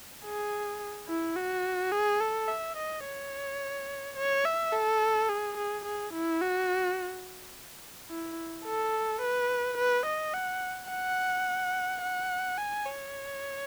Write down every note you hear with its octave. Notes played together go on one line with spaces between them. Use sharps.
G#4
E4
F#4
G#4
A4
E5
D#5
C#5
C#5
E5
A4
G#4
G#4
G#4
E4
F#4
E4
A4
B4
B4
D#5
F#5
F#5
F#5
G#5
C#5